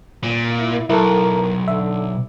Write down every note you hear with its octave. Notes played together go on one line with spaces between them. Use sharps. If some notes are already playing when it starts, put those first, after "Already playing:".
A#2
E4
B1 E4 A4 A#4
D3 E5